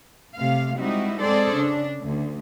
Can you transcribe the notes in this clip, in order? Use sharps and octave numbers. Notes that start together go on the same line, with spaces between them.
C3 A3 F5
G3 G#3 C4 D#4 E4 F#4
G#3 C4 G#4 A4 C5 D5
C#3 D4
D2